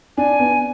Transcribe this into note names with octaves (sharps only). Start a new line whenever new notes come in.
D4 G#5
B3